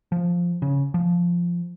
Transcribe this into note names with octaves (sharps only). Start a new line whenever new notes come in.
F3
C#3
F3